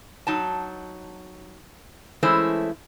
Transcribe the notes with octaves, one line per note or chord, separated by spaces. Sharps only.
F#3 D#4 A5
E3 G#3 A3 C#4 E4 C5